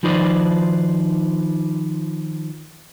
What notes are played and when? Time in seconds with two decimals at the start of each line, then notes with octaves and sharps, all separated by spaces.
0.03 D#3 F3 D#4 B4 C5 D5